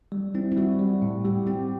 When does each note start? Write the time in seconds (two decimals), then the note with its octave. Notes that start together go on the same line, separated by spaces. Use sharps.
0.12 G3
0.35 C4 E4
0.52 E4
0.57 G3 F#4
0.79 G3
1.02 A2
1.25 G3 G4
1.47 C4 G4